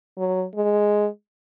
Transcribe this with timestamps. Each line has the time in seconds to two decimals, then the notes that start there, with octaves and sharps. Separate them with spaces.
0.18 F#3
0.55 G#3